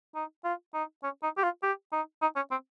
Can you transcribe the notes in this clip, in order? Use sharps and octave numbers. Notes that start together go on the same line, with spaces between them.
D#4
F4
D#4
C#4
D#4
G4
F4
G4
D#4
D#4
C#4
C4